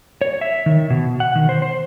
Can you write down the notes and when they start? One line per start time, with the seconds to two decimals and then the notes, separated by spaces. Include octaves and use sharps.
0.21 C#5
0.41 E5
0.66 D#3
0.90 B2
1.20 F#5
1.35 D#3
1.49 C5
1.62 C5